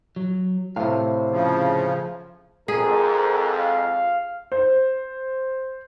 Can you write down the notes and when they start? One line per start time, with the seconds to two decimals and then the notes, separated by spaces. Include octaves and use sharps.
0.16 F#3
0.76 A2 C3 C5 F5
1.30 C#3 F3
2.68 F2 G#2 G#4 A#4
3.59 F5
4.52 C5